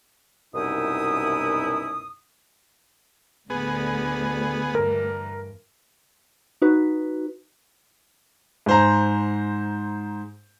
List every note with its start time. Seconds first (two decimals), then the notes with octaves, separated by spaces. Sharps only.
0.54 C2 F#2 B2 D#4 E4 D#6
3.50 D2 A2 D3 A3 B3 G#4
4.75 G2 E3 A#4
6.62 D#4 F#4 B4
8.66 G#2 C5 A#5